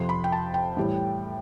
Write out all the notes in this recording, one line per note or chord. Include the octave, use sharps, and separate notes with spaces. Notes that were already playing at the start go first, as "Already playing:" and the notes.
Already playing: F2 C3 F3 C6
B5
G5
A5
G5
A2 E3 G3